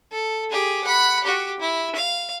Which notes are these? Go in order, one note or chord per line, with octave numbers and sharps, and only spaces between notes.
A4
G4 G#4
F#5 B5
F#4 G4
E4
F5